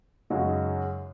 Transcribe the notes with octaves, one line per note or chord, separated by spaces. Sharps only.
F#2 C#3 G#3 D#4 F#4